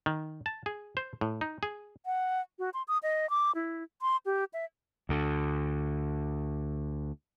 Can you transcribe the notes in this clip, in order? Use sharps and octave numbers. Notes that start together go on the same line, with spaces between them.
D#3
A5
G#4
C5
A2
D#4
G#4
F#5
F#4
C6
D#6
D#5
D6
E4
C6
G4
E5
D2 D3